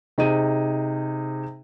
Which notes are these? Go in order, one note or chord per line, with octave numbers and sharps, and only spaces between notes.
C3 D#4 G#4 D#7